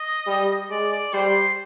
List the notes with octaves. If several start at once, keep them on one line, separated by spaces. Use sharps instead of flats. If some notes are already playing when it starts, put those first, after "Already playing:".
Already playing: D#5
G3
G#3 D5
D5
G3 C5